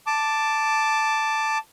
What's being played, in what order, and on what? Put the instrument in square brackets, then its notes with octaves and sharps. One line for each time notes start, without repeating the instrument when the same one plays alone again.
[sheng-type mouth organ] A5 D6